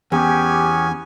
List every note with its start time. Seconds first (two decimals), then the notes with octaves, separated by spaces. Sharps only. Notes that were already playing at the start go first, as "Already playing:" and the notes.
0.12 E2 B3 C#4 G4 G#5